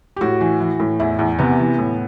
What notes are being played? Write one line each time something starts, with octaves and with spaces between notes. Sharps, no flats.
G4
A2 F#4
E3
E3
A2
E2 E4
E2
C3 B3
E3
A2